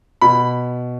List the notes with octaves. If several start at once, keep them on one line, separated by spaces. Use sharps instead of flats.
B2 B5